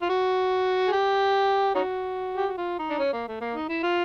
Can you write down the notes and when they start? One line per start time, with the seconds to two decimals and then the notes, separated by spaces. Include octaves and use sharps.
0.02 F4
0.09 F#4
0.88 G#4
0.92 G4
1.75 C#4 D#4 F#4
2.37 G4
2.47 F#4
2.57 F4
2.79 D#4
2.90 D4
2.99 C#4
3.13 A#3
3.28 A3
3.41 A#3
3.54 D#4
3.69 E4
3.83 F4